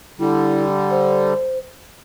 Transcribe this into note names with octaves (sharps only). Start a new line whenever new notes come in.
D3 G3 E4
C5